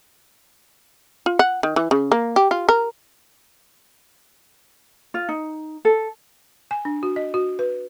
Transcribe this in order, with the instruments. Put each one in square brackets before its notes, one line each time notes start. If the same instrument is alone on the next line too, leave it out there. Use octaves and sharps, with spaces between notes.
[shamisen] F4
F#5
D#3
E3
C#3
A#3
G4
F4
A#4
[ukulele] F4
D#4
A4
[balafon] G#5
D4
F#4
D#5
F#4
B4